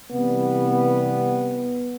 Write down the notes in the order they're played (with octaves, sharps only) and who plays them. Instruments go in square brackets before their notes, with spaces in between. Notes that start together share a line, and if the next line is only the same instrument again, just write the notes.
[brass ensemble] C3 E3 G3 B3